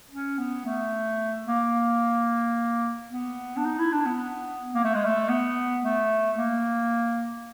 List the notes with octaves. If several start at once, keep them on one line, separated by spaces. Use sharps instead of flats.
C#4
B3
A3
A#3
B3
D4
D#4
E4
D4
B3
A#3
A3
G#3
A3
B3
A3
A#3